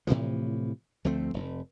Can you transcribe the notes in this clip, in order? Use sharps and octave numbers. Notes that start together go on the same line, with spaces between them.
A2 C3 E3 F3
D2 F3 A3 C4
F1